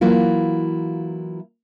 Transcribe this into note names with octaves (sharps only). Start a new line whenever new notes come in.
E3 F#3 A#3 E4 F4